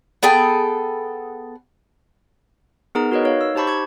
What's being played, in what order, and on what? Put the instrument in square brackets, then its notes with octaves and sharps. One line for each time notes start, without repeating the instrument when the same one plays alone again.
[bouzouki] B3 G#4 A4 G5
[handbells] B3 D#4 G#4 A#4 A#5
F#4 A#4 B4 C#5 D#5
D#4 C#5 F5
E6
D#4 G4 C5 A5 B5 C#6
G4 C#6 G#6